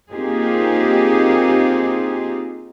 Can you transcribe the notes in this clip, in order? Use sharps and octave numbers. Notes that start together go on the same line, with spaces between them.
A#3 C4 D#4 F4 G4 G#4